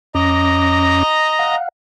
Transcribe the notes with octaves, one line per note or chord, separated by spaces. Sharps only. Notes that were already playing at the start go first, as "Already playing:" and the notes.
F2 C#4 D#5 A#5 D6
F5 F#5